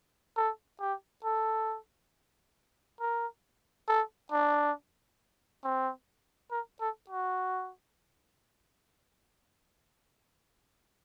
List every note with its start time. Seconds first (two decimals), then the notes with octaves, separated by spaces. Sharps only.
0.36 A4
0.81 G4
1.24 A4
3.00 A#4
3.88 A4
4.32 D4
5.64 C4
6.51 A#4
6.81 A4
7.10 F#4